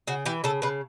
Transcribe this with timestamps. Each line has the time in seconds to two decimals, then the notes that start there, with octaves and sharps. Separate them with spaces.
0.07 C#3 F#4
0.26 E3 G4
0.44 C#3 A4
0.62 C#3 B4